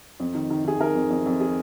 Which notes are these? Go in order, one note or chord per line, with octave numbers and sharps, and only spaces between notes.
F2
D#3
D#3
D#3 G#4
D#3 A#4
F2
F2
F2
G#4